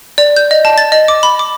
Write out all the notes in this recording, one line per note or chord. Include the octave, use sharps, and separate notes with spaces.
D5
G6
D#5
A5
A6
D#5
D6
B5
D6